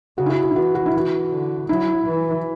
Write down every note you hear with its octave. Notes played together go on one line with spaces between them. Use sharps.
C#3 F#4
E4
F#4
F#4
E4
E3 F#4
F#4
E4
E3 F#4
D3
F#3 E4
E3